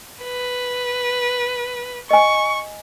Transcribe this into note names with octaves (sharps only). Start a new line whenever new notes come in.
B4
D#5 G#5 C#6